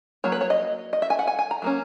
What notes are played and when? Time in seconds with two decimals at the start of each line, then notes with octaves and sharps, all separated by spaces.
0.24 F#3 A#3 C#5
0.32 B4
0.41 C#5
0.50 D#5
0.93 D#5
1.02 E5
1.10 G#5
1.19 F#5
1.27 G#5
1.39 G#5
1.51 A#5
1.62 F#3 A#3 C#4